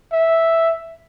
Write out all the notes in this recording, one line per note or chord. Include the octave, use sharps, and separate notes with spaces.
E5